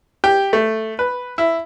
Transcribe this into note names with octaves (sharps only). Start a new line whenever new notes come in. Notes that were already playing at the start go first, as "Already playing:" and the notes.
G4
A3
B4
E4